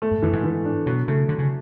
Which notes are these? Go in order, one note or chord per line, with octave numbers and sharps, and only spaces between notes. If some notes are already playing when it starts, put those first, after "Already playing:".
A3
G#2
F#2 E3
G#2
E3
D4
B2 F#3
C#3 A3
D3 F#3
C#3